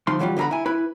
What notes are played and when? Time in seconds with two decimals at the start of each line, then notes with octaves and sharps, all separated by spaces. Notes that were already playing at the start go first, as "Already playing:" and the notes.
0.07 D2 F3 D#4 C6
0.19 E3 F#3 G3 C#4 F4
0.37 D3 B3 E5 A#5 B5
0.51 E4 G#5
0.66 E4 B4 B5